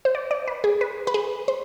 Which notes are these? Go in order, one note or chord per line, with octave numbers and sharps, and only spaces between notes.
C5
D5
D5
B4
G#4
B4
B4
G#4
C5